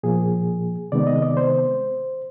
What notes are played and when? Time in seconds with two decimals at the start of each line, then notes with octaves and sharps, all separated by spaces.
0.03 A#2 F3 A#3 G#4
0.92 C3 D#3 G#3 B3 D5
1.07 D#5
1.22 D5
1.37 C5